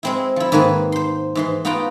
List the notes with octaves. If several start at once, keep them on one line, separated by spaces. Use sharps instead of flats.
G#3 C4 E4
F3 E4
G#2 D#3 A#3 B4 G#5
C5 C6
G#2 E3 C6
B3 D#4 F4 F#4 G5 A#5